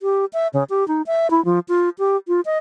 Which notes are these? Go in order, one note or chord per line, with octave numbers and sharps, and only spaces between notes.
G4
E5
C#3
G4
D#4
E5
E4
F3
F4
G4
F4
D#5